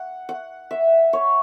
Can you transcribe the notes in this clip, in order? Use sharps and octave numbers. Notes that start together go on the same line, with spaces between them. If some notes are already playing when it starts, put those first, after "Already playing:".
Already playing: F#5
F#5
E5
C#5